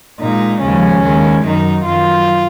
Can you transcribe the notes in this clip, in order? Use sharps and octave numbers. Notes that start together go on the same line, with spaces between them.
A#2 G#3 D#4
D#2 C#3 F3 G#3 C#4
D#2 D#3 G#3
F#2 D#3 F#3 D#4
F#2 D#3 F#3 F4